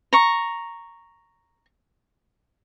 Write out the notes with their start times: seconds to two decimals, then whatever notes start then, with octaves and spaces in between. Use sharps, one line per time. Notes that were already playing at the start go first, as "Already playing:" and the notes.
0.13 A#5 C#6